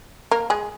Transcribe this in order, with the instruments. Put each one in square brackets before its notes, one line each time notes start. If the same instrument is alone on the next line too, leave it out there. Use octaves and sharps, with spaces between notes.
[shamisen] A#3 A#4
G#3 G#4